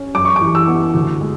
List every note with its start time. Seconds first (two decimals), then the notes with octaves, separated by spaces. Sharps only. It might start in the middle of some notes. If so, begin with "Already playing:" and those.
Already playing: C#4
0.15 F#2 D6
0.25 C#6
0.36 D6
0.41 E3
0.55 E6
0.68 B3
0.94 D2
1.21 G#3